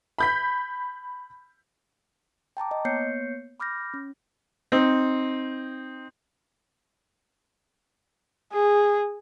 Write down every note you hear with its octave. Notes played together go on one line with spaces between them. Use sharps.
B5 G6 B6
G5 A5 A#5 D6
D#5
A#3 B3 C#5 G6 C7 C#7
B5 D6 F6 G6 A#6
C#4
C4 D#4
G#4